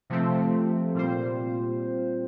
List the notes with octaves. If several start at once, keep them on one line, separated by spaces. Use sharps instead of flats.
C3 F3 A3 C4
A#2 G3 C4 F4 C5